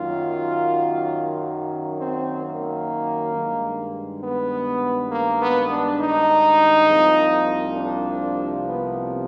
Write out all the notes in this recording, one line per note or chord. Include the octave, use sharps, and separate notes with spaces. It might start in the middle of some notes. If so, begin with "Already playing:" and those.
Already playing: F#2 D#3 F#3 A#3 F4
C4
A#3
G2 D#3 G#3
B3
A#3
B3
D4
D#4
C2 C3 F3 A#3
D4
B3